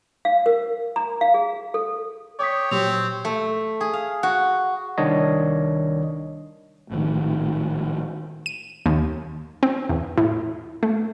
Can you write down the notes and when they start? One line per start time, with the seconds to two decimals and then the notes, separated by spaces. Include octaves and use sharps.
0.25 F5
0.46 A#4
0.96 A#5
1.21 F5
1.34 G#4
1.74 A4
2.39 C#5 G5 D6 D#6 B6
2.71 A#2 F#3 C4 G4 F7
3.25 A3
3.81 G#4
3.93 F5
4.23 F#4
4.98 C2 D#3 D4 C#5 D#5
6.90 A#1 A2 D#3
8.46 D#7
8.86 D#2
9.63 C4
9.89 E2
10.18 A2
10.83 A3